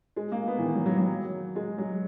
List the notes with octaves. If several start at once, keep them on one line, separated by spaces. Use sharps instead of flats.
G#3
A#3
B3
E3
D#3
F#3
F#3
F#3
G#3
F#3